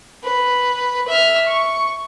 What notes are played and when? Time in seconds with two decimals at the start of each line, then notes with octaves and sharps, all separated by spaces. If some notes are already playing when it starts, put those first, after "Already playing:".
0.24 B4
1.08 E5 F6
1.47 C#6